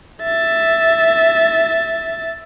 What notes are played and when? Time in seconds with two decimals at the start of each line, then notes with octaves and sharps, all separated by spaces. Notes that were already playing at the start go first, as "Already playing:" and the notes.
0.23 E5 A6